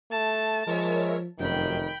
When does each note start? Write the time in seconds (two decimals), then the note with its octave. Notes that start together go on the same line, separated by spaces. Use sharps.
0.11 A3 A5
0.67 F3 G#3 A#4 C#5 E5
1.39 F1 F#2 D#3 G5 B5